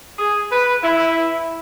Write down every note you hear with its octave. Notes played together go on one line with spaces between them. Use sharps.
G#4
B4
E4